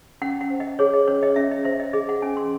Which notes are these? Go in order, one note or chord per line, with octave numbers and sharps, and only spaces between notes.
C#4 F#5
F#5
C5
D#5
G#4 C#5
D#5
C#4 C#5
D#5
C#4 E5
D#5
C5 E5
D#5
G#4 D#5
F#5
C#4 G#5
C6